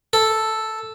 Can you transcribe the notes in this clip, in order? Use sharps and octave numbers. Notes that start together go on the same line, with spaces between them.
A4